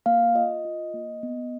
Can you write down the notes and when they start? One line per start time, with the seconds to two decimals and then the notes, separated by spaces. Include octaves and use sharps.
0.06 A#3 F5
0.35 F4 D#5
0.65 F4
0.94 A#3
1.23 B3